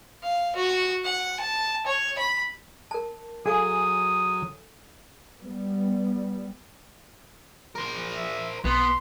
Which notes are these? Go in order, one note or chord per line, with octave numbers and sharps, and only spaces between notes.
F5
F#4
F#5
A5
C#5
B5
A#4 A5
F#3 G#4 A4 F5 G#5 D#6
G3 B3
A#4 C5
E5
B1 B3 C6